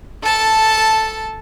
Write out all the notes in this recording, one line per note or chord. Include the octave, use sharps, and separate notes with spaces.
A4 A5